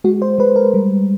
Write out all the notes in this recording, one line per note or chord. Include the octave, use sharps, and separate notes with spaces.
G#3 F#4
C5
G#3 B4
A#4
G3